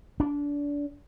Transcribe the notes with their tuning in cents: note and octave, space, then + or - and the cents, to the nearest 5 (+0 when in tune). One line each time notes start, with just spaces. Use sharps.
D4 -25